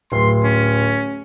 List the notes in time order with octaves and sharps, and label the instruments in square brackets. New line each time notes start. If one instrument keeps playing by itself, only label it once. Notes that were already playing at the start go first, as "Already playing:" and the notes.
[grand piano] D1 [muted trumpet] C6
[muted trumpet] C#4